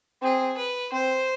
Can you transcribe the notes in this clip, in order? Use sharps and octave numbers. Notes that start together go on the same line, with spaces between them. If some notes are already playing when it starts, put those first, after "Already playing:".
C4 G#4
B4
C4 C5